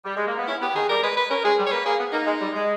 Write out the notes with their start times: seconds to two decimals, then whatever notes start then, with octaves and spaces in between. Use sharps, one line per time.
0.06 G3
0.17 G#3
0.27 A#3
0.38 B3
0.47 C#4 E4
0.61 B3 G4
0.75 D#3 G#4
0.89 G3 A#4
1.02 G#3 B4
1.17 B4
1.30 C#4 A#4
1.44 G#3 G#4
1.59 G3
1.66 C#5
1.72 A#3 B4
1.86 A#3 G#4
1.99 B3
2.12 A#3 D#4
2.27 G#3
2.40 G3
2.54 G#3